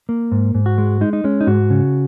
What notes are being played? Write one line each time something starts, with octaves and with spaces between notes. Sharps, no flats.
A#3
G#2
G#2
F#4
G#3
G#3 D#4
D#4
G#3 C#4
D#4
G#2 F#4
C#3